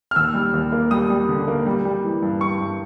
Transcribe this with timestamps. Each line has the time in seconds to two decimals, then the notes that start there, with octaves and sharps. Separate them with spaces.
0.11 F6
0.16 D#2 E6
0.34 G3
0.54 D#2
0.72 A#3
0.91 G3 D#6
1.10 G3
1.29 D3
1.48 A#3
1.67 G3
1.85 G3
2.04 E3
2.23 G2
2.41 G2 C#6
2.60 G2